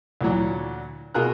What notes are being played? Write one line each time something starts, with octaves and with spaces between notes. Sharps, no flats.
D2 A#2 E3 F#3
B2 F4 G#4 A#4 A#5 F#6